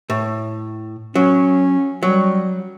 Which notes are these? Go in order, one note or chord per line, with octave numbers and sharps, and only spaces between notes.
A2
F#3 C#4
F#3 G3